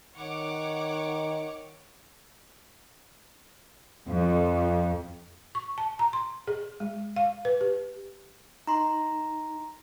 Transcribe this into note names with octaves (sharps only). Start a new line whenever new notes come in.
D#3 C#5 F#5 D6
F2
C#6
A5
A#5
C6
G#4
G#3
F5
B4
G4
D#4 A#5 C6